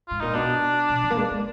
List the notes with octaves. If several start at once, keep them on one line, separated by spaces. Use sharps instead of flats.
G#2 F4
A#2 D#4
B2 D4
B2
F3
A#3
G#3
B3